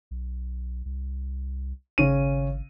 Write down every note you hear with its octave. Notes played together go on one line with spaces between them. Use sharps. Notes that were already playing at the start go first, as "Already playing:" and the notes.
B1
C2
G#1 C#3 C#4 D#7